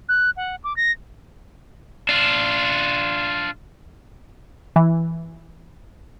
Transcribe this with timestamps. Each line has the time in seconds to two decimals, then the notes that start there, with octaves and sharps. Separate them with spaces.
0.09 F#6
0.37 F#5
0.64 D6
0.77 A#6
2.09 D4 F4
4.76 E3